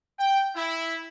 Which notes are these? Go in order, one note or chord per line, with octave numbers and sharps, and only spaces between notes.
G5
E4